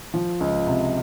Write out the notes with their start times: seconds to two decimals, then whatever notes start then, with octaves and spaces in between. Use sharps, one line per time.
0.14 F3
0.40 C#2
0.67 C3